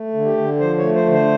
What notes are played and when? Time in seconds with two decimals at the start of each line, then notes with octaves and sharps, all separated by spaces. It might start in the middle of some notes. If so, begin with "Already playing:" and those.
Already playing: A3
0.14 D3
0.25 G4
0.37 D3
0.60 F3 C5
0.78 A3 C#5
0.95 C5
1.06 D3
1.13 C5